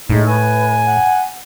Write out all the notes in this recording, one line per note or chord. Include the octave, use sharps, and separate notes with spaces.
A2 G#3 D#4
B4 G#5
F#5